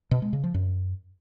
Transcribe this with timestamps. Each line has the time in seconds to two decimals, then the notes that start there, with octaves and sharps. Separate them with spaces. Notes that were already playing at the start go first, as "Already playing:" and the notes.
0.11 B2
0.22 G#3
0.33 C#3
0.44 F3
0.54 F#2